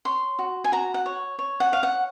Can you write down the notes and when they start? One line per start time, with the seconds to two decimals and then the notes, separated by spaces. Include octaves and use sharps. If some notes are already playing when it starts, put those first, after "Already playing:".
0.05 C#5 C6
0.39 F#4
0.64 G#5
0.72 F#4 A#5
0.94 F#5
1.06 C#5
1.39 C#5
1.60 F#5
1.72 C#5 F5
1.83 F#5